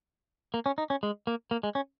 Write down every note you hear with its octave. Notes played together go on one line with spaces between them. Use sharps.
A#3
C#4
D#4
C#4
G#3
A#3
A#3
G#3
C#4